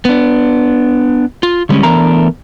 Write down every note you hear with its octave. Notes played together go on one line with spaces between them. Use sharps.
B3 D4
F4
D3 G3 G#3 C#4
E3 A3 B3 D4 A#4 A#5